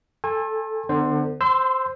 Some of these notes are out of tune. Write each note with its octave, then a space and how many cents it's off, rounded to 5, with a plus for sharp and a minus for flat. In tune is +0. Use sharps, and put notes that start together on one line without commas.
A4 +0 G#5 -30 C6 +45
D3 +30 B3 +30 C5 +0
C5 +0 C6 -30 E6 +0